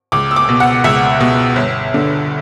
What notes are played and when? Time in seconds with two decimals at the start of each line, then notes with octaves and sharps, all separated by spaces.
0.12 C#2 D6
0.31 E6
0.36 D6
0.49 B2
0.60 F#5
0.84 C#2 E5
1.20 B2
1.56 G1
1.94 D3